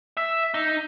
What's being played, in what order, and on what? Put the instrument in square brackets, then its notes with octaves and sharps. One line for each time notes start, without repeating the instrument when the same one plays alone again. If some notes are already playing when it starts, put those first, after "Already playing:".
[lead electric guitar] E5
D#4